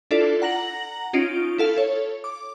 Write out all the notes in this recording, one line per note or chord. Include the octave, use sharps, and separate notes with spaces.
D4 E4 F4 A4 D5
F#5 A#5 A#6 F#7
C#4 D#4 F4 D7
E4 A4 F5
A4 C#5
D6